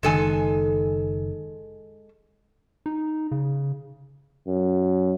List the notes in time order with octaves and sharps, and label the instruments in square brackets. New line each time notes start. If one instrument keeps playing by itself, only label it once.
[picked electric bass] F#1 D#3 [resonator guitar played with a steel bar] G#3 A4 G#5
[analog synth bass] D#4
C#3
[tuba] F#2